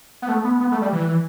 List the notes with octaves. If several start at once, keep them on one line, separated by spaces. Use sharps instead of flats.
B3
A3
B3
B3
A3
G3
E3